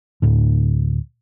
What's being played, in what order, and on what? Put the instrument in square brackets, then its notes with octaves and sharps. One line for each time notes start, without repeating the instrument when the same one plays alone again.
[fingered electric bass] D2 A2 D3